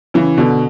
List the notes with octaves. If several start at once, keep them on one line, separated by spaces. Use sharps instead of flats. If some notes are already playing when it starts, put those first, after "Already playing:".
C#3 E3
B2 D3